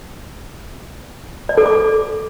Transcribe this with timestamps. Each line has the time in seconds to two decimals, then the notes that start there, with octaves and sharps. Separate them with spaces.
1.49 D5
1.57 A4
1.66 D6